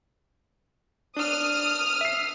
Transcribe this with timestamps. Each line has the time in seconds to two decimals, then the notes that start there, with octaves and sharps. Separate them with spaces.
1.16 D4 D#6 F6
2.01 E5 C7